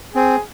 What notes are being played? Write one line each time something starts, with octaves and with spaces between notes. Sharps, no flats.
C4 G#4